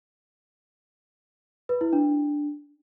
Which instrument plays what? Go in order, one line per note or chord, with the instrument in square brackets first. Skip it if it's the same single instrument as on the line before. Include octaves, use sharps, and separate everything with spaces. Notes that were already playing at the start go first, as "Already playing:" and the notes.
[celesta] B4
E4
D4